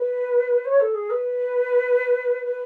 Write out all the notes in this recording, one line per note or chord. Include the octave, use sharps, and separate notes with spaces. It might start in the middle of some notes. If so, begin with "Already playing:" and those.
Already playing: B4
C#5
A4
G#4
B4
B4